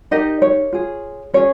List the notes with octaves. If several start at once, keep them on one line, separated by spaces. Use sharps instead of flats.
D#4 G4 A#4 D#5
C#5
F4 G#4
C#4 G#4 C#5